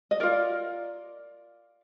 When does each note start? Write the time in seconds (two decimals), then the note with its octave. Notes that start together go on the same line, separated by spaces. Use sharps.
0.11 D#5
0.20 F4 A#4 D5